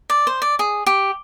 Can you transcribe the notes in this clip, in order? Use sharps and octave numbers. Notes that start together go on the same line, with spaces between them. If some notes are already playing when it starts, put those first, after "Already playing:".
D5
C5
D5
G#4
G4